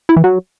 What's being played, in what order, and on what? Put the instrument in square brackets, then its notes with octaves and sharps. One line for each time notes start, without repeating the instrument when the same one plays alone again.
[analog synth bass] E4
E3
F#3